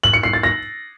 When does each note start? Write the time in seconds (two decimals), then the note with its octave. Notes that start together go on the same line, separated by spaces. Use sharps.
0.03 F#7
0.13 C#7
0.23 C7
0.33 A6
0.43 A#6